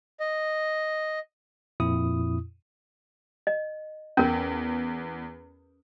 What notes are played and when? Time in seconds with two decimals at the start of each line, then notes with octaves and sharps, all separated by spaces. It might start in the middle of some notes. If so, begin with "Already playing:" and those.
0.20 D#5
1.80 F2 A#2 E4 D#6
3.47 D#5
4.17 E2 C#4 A#4